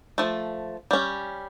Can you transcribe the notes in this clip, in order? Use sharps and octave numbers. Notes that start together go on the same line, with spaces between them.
F3 A3
G3 C#4